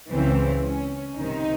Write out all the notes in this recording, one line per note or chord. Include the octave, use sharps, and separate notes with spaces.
C#2 C#3 E3 C4
C#4
C2 C3 D#3 D#4